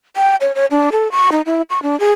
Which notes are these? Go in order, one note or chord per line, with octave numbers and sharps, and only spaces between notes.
G5
C#5
C#5
D4
A4
C#6
D#4
E4
C#6
D4
G#4